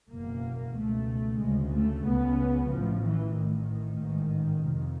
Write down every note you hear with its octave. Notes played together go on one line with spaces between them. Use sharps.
F#1 E2 B2 A#3
C#2 B2 A3
D2 C#3 G#3
A3
C#2 C#3 B3
A1 A2 F3
E3
A1 A2 D#3
A1 G#2
F1 F2 C3